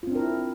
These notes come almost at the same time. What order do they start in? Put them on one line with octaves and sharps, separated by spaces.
F4 C4 D4 A#4 E4